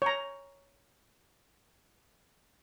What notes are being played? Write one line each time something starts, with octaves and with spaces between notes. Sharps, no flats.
C#5 A#5